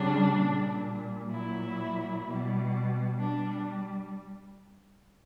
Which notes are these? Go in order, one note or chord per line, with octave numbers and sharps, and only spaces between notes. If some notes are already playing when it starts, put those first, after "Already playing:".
Already playing: C#3 G3 D4
A#2 G3
A#2 F#3 E4
B2 G3
G3 D4